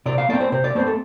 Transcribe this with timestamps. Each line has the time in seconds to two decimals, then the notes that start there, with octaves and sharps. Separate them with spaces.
0.06 C3 D5
0.18 F5
0.29 A3 C4 D5
0.40 C5
0.52 C3 C5
0.64 D5
0.75 A3 C4 C5
0.87 A4